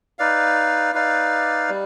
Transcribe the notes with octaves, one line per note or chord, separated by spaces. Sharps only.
D#4 B4 D5 F5
D#4 B4 D5 F5
G3